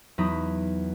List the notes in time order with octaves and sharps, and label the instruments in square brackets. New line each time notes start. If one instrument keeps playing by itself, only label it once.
[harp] E2 F#3 D#4 B5 D#6